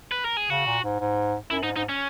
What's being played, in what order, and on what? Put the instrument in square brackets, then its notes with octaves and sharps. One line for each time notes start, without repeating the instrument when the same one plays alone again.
[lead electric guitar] B4
A#4
G#4
[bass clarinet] C#3 [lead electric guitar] F#4
[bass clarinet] A#2
G#2
G#2
[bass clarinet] F#2 [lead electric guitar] E4
[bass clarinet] G#2 [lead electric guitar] D#4
[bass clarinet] G#2 [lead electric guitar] D#4
[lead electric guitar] C#4